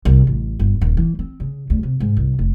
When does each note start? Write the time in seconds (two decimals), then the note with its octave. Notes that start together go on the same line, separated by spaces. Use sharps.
0.05 C2
0.27 A1
0.59 G1
0.81 D#1
0.97 E3
1.19 C4
1.40 C#3
1.70 D2
1.83 C3
2.00 G#2
2.17 C2
2.39 F1